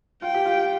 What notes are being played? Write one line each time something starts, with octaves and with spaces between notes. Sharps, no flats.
F4 G5
G4
F4